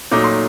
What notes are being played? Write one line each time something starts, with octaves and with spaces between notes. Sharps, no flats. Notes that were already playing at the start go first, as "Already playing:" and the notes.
A#2 F#3 A3 D#4 D6
C6